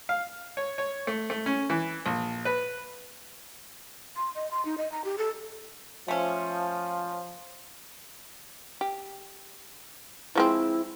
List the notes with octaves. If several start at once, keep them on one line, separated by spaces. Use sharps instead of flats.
F5
C#5
C#5
A3
A3
C#4
E3
A#1
B4
C6
D#5
C6
D#4
D#5
A#5
G4
A4
F3 A3 C#4
G4
F3 G#3 C4 E4